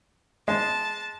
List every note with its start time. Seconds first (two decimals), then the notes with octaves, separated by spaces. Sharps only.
0.48 G#3 A5